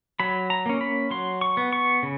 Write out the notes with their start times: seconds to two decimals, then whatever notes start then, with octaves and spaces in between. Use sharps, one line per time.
0.20 F#3 B5
0.50 A#5
0.66 A#3 C#4
0.81 B5
1.11 F#3 C6
1.41 C#6
1.57 B3
1.73 C#6
2.03 C#3